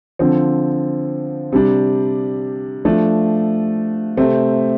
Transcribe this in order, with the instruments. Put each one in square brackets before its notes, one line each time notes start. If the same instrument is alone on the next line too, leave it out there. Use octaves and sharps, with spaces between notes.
[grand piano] D3 F3 C4
C3 G3 D4
F3 A3 D4
C3 A3 C4